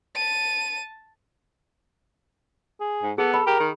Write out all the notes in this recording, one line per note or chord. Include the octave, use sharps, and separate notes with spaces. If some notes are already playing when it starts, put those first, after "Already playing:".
A5 D#7
G#4
G#2
B3 G#4 A4
A4 B5
G4 A#4
D#3